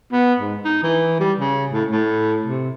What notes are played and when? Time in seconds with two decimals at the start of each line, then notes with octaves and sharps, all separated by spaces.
0.12 B3
0.39 G#2
0.64 D#4
0.83 E3
1.20 G3
1.39 C#3
1.72 A2
1.91 A2
2.46 C3